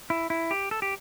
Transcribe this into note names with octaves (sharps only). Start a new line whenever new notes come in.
E4
E4
G4
A4
G4